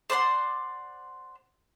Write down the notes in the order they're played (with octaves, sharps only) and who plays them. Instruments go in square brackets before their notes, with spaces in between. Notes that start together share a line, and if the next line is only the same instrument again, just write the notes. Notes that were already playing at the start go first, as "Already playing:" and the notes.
[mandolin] C5 D5 F#5 C6